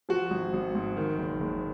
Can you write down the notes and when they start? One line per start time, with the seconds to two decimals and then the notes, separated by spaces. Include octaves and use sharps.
0.09 F3 F#4
0.31 G#1
0.53 G#1
0.75 G#2
0.97 D#3
1.18 F#1
1.40 F#1